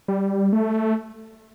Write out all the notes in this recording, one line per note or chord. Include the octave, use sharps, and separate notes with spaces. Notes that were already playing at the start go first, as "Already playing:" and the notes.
G3
A3